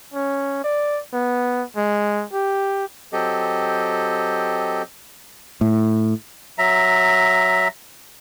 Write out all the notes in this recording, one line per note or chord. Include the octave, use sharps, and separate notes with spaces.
C#4
D5
B3
G#3
G4
F#3 C4 G4 A4 D#5
A2
F#3 E5 A#5